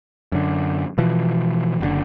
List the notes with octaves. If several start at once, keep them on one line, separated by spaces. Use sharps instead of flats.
F#2 D3
B2 E3 F3
F#1 B2 D3